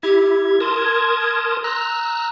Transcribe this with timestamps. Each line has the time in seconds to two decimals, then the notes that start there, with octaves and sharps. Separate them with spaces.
0.03 E4 G4 G#6
0.60 A#4 A5 C6 D#6
1.64 A#5 E6 F#6